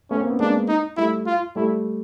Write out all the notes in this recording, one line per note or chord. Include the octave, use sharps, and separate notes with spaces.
A3 B3 C#4
A#3 C4
B3 C#4
G#3 A#3 D4
D#4
G3 A3 E4
F4
G3 A3 E4